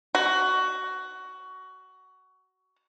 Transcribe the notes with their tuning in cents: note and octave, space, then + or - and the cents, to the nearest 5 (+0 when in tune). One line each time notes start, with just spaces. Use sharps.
F#4 +15